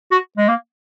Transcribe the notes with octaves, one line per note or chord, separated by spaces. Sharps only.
F#4
G#3
A#3